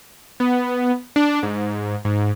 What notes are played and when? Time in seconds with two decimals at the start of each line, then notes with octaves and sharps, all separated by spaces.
0.40 B3
1.16 D4
1.43 G#2
2.05 G#2